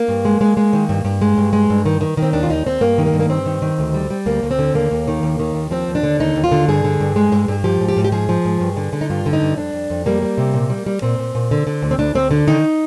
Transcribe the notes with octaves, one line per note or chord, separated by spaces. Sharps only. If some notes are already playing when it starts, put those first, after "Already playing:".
Already playing: A#3
G2
G#3
G#3
G#3
D#3
G2
G2
G#3
G2
G#3
G2
D#3
D#3
D#3
C4
D#2 D4
F4
D#2 D#4
D#2 C4
G2 A#3
D#3
A#3
G2
A#3
G2 C4
D#3
D#3
D2
G3
G3
D2 A#3
D2
C4
D3
D#2 A#3
D#2
D#3
D#2
D#3
D#2
F3 C4
D#2
D4
D3
D#2 D#4
D#2
F4
D3
G2 G#4
D3
G2
G#3
G2
G2
F3 G4
G#2
G4
G#2
G4
F3 G#4
F3
G#2
G2
D3
D3
D#4
G2 F4
D3
D#4
G2
F2 D4
F2
F2
G3 A#3
G3
C3
A#2
G3
G3
A#2 C4
A#2
A#2
D3
D3
D2
C4
D2 D4
D2 C4
D3 D4
D#3 D#4